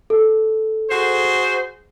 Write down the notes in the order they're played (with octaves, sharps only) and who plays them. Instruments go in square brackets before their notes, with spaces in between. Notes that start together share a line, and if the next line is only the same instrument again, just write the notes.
[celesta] A4
[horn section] F#4 G#4 C5